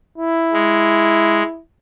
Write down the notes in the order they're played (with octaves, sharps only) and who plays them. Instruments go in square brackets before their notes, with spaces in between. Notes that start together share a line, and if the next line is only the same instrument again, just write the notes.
[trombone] E4
[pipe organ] G#3